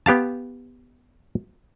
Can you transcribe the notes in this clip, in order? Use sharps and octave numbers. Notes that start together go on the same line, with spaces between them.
B3 G4 F5 A5